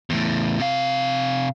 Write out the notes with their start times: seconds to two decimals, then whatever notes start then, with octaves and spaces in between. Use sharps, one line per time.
0.10 E2 A2
0.60 C3 F5